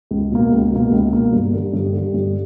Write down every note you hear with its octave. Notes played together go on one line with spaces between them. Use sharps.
C#2
B2 A#3
C#2
B2 A#3
C#2
B2 A#3
G2
D3 G3
G2
D3 G3
G2